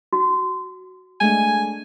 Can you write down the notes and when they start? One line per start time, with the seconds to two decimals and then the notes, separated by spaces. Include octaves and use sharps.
0.13 F#4
1.21 G#3 A3 D4 G#5